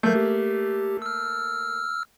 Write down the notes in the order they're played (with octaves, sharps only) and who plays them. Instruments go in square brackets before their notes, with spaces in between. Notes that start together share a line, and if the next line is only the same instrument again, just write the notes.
[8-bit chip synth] F#3 G6 [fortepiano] A3 A#3
[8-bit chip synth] G4
E6 F6